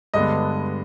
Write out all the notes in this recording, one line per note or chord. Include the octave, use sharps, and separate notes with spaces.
G2 D3 G#3 B3 D#5